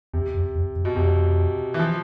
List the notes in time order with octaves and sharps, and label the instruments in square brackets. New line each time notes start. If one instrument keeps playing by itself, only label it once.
[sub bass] E2 [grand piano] C3
[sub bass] F2
F2
F#2
[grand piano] B2
[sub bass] F2 [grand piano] C3
[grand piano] E3
F3